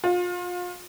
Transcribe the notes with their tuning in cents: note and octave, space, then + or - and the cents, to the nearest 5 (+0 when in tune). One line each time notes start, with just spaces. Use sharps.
F4 +30